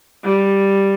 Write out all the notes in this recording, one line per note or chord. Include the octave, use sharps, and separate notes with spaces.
G3